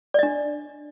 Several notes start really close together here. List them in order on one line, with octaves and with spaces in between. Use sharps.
D5 D#5 D4